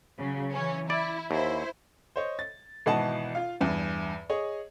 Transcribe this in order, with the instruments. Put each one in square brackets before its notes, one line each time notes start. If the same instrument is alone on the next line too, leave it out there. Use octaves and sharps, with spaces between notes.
[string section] C#3 F#3
E3 C#4
[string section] E4 [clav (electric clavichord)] D5
[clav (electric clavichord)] D#2 [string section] E4 C5
[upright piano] C5 C#5 D#5
A6
G#1 B2 E3 D#5 F#5 A5
F4 F5
E2 G2
G#4 C#5 D#5